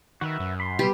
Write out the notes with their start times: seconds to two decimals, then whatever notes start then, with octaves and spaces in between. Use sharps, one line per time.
0.21 D#3 F#4 B4 E5
0.40 F#2
0.60 B5 C6
0.79 B2 G3 B3 G4 B4